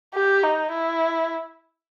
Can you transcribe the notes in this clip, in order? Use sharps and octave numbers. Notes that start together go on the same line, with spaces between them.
G4
D#4
E4